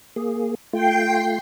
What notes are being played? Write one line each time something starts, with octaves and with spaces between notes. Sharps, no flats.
A#3 G#4
A3 F4 G5 C7